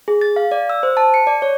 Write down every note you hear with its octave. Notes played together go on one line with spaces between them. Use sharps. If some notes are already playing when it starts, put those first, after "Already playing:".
G#4
A6
F5
D5
E6
C5
A5
C#7
D5
C#5